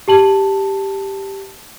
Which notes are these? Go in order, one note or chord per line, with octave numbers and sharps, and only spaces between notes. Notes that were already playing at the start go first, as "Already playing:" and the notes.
G4 A5 F#7